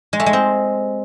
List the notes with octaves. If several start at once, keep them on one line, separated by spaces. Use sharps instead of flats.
G#3
A3
G#3
C4